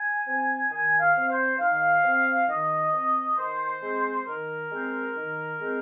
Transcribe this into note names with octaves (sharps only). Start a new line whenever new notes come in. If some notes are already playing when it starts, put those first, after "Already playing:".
Already playing: G#5
C4
D#3 G#5
F5
C4
C5
D#3 F5
C4
D#3 D#5
C4
D#3 C5
G#3 C4
D#3 A#4
G#3 C4
D#3
G#3 C4